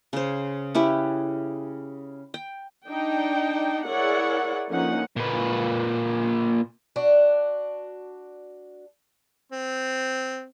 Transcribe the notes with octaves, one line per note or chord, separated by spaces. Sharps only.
C#3 C5
C#4 E4 G4 B4
G5
D4 D#4 G5
E4 G#4 A#4 C#5 D5 F#5
D3 F3 A#3 C#4 D#4 F#5
A#2 B4
D4 F#4
C4